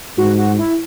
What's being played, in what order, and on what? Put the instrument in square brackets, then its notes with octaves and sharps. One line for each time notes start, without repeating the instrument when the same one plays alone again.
[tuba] G#2 [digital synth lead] F#4
[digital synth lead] F#4
E4